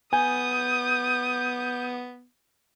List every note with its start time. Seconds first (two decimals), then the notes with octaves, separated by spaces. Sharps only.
0.13 B3 G#5 D#6 G6